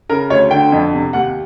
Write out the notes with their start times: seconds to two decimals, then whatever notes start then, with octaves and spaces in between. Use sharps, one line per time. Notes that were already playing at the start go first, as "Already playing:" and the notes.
0.09 C#3 A#4
0.30 D2 C#5
0.51 D3 G5
0.72 F2
0.93 C3
1.13 D#2 F#5